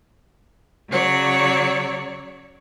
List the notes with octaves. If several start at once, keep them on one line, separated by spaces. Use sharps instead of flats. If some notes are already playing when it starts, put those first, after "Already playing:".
C#3 F#3 C#5 D5